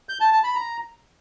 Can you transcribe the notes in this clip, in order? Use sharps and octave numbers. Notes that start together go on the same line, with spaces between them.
G6
A5
A5
B5
A#5